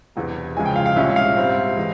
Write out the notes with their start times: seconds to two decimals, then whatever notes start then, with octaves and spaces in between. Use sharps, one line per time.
0.16 E1 E2 C3 E3
0.56 C#2 C#3 F3 G#3 E4 G#5
0.66 G5
0.76 F5
0.86 F5
0.96 C2 A#2 G#3 C#4 E4 E5
1.16 F5
1.37 G#2 G3 C4 E4
1.77 E3 G#3